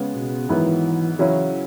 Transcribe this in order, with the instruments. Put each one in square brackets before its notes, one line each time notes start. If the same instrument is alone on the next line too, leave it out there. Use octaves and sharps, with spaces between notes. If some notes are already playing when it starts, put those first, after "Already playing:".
Already playing: [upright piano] C#3 G#3 B3
[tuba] B2
[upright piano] G#2 D#3 F#3 B3 E4 [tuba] E3
[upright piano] C#3 F#3 C#4 E4 [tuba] E3